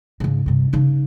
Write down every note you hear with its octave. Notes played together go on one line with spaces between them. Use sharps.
G#2 C#3
G2 C3
C#3 D#4